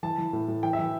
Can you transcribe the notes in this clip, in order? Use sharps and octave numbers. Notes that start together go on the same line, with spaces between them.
E3 A5
E3
A2
A2
E3 G5
E5
E3